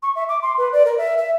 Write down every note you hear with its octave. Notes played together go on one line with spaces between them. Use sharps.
C#6
E5
D6
C6
B4
D5
A#4
E5
E5